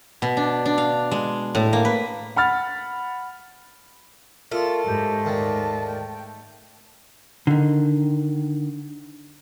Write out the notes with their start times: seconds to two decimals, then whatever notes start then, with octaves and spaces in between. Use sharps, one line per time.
0.22 B2
0.37 D4
0.65 D4
0.78 F5
1.11 G#3
1.55 A2
1.73 A#3
1.85 B4
2.36 F#5 B5 F6 A6
4.51 A3 F4 A#4 D5
4.86 G#2 G4
5.25 D#2 A#2 D#3 A5
5.87 G5
7.47 D3 D#3